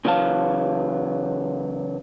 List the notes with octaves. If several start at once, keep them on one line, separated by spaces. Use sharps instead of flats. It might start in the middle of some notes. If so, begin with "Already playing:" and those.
C#3 E3 F#3 F5 A5